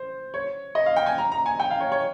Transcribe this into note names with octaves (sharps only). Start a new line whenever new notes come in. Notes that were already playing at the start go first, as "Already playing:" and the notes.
Already playing: C5
C#5
D#5
F5
G5
G#5
A#5
A#5
G#5
G5
F5
C#5
C#5